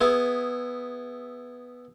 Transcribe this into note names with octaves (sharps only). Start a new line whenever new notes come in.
B3 E4 G#4